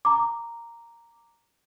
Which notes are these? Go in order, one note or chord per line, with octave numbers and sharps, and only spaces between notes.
A#5 D6